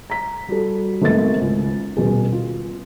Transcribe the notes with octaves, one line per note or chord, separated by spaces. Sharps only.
A#5 B6
G3 F#4 A4
G#1 A3 B3 A6
C#2
D#1 B2 G#4
F4